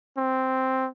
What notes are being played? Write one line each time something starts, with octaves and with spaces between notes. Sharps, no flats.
C4